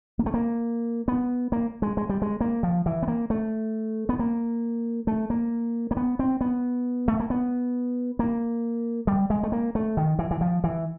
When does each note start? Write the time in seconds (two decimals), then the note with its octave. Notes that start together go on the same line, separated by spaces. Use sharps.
0.19 A#3
0.26 A3
0.34 A#3
1.08 B3
1.52 A#3
1.82 G#3
1.97 G#3
2.09 G3
2.22 G#3
2.41 A#3
2.63 F3
2.86 E3
3.03 B3
3.08 A#3
3.30 A3
4.09 B3
4.19 A#3
5.07 A3
5.30 A#3
5.91 A#3
5.97 B3
6.19 C4
6.41 B3
7.08 A3
7.20 A#3
7.30 B3
8.19 A#3
9.07 G3
9.30 G#3
9.43 A3
9.52 A#3
9.75 A3
9.97 D#3
10.19 E3
10.31 E3
10.41 F3
10.64 E3